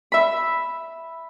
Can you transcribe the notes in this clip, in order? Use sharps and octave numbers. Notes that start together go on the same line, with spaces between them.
E5 B5